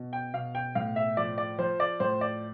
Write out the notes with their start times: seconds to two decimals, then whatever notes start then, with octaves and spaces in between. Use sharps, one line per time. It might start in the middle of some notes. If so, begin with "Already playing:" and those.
Already playing: B2
0.13 G5
0.34 B2 F5
0.55 G5
0.75 A2 F5
0.96 E5
1.17 F3 D5
1.38 D5
1.58 F3 C5
1.80 D5
2.00 A2 C5
2.21 D5